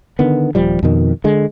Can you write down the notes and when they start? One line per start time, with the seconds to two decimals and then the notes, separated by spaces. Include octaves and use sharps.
0.19 D3 D#3 B3
0.55 D#1 F3 G3
0.83 F2 B2 D#3
1.24 D3 G#3